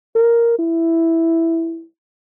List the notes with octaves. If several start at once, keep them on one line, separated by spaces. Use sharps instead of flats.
A#4
E4